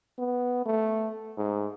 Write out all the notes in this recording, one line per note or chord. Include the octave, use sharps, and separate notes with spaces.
B3
A3
G#2